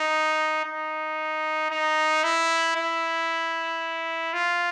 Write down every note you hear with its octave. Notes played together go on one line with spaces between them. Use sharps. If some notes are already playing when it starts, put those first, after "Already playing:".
Already playing: D#4
D#4
D#4
E4
E4
F4